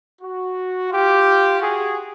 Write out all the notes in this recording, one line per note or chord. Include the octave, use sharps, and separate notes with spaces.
F#4
F4 G4
F#4 G#4